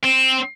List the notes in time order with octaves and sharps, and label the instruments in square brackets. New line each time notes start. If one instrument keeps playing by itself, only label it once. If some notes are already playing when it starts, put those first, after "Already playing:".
[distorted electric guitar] C4